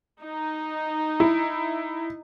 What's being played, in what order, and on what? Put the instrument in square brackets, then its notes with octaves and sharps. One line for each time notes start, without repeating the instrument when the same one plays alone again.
[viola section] D#4
[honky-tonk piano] E4